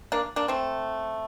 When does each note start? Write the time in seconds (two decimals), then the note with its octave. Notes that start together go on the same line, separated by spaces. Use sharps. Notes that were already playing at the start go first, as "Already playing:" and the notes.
0.12 A#3 D4
0.36 A#3 D4
0.48 A3 C4